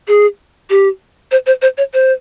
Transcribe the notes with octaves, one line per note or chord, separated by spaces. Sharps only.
G#4
G4
C5
C5
C5
C#5
C5